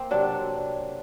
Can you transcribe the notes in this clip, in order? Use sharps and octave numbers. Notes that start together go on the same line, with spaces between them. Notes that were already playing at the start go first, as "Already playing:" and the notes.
Already playing: A#3 C4
C3 F#3 D4